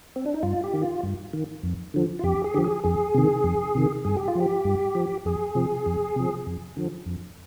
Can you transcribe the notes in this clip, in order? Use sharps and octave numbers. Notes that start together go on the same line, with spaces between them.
C4
D4
D#4
G2 F4
G4
D#3
F4
G2
D#3
F2
D3 F3
F4
F2 G4
G#4
D3 F3 G4
G#4
F2 G#4
C3 D#3
F2
C3 D#3
G2 G#4
G4
F4
F3 G4
G2
F3
F2 G#4
C3 F3
F2
C3 F3
F2
D3 F3
F2